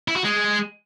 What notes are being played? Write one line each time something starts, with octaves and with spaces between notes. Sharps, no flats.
E4
F#4
G#3